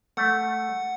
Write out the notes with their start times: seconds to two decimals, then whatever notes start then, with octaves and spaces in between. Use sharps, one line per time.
0.17 A3 F#5